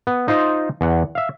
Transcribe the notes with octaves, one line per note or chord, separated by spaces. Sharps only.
B3
D#4 F4 C5 D#5
E2 F#5
E5 F5